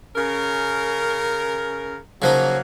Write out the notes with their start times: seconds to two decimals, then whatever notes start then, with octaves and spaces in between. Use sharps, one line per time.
0.16 C#3 C#4 A#4
2.22 C#3 F3 F#3 A#3 D#4